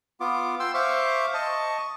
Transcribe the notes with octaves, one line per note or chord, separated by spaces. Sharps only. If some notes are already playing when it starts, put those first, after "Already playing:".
B3 F4 D6
G5 C6 E6
C5 E5 F5 C#6 D6
D#5 A5 C#6